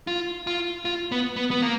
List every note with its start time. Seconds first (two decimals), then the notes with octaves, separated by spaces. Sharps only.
0.07 F4
0.47 F4
0.85 F4
1.12 B3
1.36 B3
1.51 B3
1.62 A#3